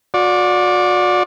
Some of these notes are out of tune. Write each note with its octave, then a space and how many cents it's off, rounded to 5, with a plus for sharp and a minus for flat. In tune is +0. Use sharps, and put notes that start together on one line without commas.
F#4 -40 D5 +0